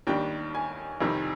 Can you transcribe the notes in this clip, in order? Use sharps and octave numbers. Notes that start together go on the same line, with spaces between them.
D#2 D#3 G3 D4 G5
G#5
F2 C3 D#3 G3